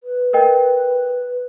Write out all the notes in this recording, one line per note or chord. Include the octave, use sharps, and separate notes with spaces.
B4
A#4 D#5 G5